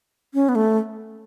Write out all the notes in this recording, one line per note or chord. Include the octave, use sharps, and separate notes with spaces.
C#4
B3
A3